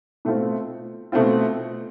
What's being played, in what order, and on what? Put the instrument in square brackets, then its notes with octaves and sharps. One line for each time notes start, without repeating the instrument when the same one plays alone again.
[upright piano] B2 A3 C4 F4
B2 A3 C4 F4